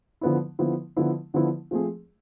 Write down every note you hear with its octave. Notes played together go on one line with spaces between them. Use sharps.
D3 F3 B3 E4
D3 F3 B3 E4
D3 F3 B3 E4
D3 F3 B3 E4
F3 A3 C4 G#4